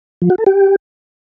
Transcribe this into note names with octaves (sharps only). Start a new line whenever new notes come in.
F3
F#4
A4
G4